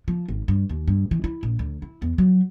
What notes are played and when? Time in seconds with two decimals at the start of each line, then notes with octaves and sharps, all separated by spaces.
0.08 F3
0.28 G#1
0.48 G2
0.69 D#2
0.88 G2
1.11 E3
1.24 E4
1.43 A#1
1.59 D2
1.82 E4
2.02 E2
2.18 F#3